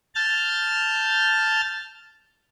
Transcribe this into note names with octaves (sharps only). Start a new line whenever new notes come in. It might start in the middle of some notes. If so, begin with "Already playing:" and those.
A5 F6 G6 A6